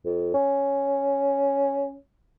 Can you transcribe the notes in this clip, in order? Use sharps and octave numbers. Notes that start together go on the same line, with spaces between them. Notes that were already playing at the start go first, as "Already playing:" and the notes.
F2
C#4